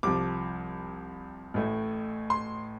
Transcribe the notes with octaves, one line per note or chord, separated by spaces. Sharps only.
C2 C3 F3 D6
A1 A2 A3
C6